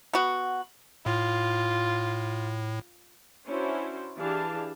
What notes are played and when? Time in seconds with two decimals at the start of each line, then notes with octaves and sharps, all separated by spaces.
0.13 B3 F#4
1.06 A2 F4
3.46 C#4 D4 E4 F#4 C5
4.16 E3 D4 G4 G#4 F5 A5